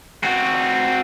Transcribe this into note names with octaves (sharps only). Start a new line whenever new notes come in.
C4 F#4